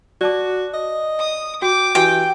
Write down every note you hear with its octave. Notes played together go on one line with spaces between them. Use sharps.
F#4 D5 A5 D6
D#5
D#6
F#4 G5 D6
E3 F#4 G4 G5 G#5